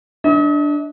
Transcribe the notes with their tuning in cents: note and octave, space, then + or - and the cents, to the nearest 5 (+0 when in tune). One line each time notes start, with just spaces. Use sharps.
D4 +0 D#5 +40